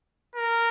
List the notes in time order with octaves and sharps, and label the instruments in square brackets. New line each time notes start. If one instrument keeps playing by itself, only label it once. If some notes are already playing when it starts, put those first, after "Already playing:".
[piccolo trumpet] A#4